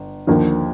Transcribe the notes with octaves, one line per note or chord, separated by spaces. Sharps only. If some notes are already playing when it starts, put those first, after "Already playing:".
Already playing: G1
D#2 D3 F3 A#3